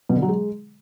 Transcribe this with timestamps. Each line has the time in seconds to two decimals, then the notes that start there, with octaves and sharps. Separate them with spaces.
0.09 B2
0.16 D3
0.22 F#3
0.29 G#3